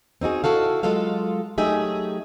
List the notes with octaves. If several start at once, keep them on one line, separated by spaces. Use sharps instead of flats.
C4 D#4 F#4 G#4
E4 F#4 A4 F5
F#3 G#3 F4 A4 F5
F#3 A3 D#4 G4 G#4 E5